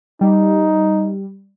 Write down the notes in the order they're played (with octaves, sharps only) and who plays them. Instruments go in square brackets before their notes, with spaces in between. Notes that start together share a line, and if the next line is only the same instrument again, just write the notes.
[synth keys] G3 [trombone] D#4